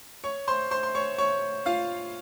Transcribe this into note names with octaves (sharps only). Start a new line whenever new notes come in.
C#5 C#6
C5 C6
C5 C6
C6
C#5 C#6
C#5 C#6
F4 F5